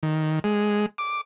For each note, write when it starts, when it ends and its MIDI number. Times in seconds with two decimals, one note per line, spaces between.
0.03 0.39 51
0.44 0.86 56
0.98 1.21 86